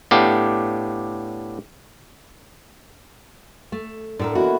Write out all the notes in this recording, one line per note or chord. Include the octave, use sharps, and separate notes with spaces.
A2 B3 D4 G4 F5
A3
A2 D3 A4 A#4
B2 E3 A#3 E4 F#4